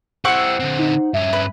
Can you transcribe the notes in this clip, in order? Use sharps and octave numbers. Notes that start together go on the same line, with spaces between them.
E4 G4 C5 F#5 C#6 E6
D3 C4
D#4
G2 C#4 E5
B4